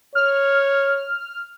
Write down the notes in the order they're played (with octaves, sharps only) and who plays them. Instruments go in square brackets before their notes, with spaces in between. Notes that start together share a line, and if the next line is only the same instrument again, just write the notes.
[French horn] C#5 [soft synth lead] F6